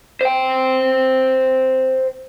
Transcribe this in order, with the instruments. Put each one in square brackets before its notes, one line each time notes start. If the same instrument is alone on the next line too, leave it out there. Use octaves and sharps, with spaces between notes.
[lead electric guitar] C5 G5